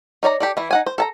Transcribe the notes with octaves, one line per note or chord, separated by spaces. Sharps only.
D#4 C#5 D5 A#5
G4 A4 D5
E3 E4
D#4 F#5 G#5
C5
A4 A5 A#5